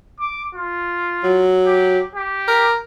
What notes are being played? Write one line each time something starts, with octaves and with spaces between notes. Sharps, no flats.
D6
F4
F#3
G4
G4
A#4